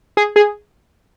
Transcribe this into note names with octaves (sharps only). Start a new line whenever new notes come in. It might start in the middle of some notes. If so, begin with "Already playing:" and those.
G#4
G#4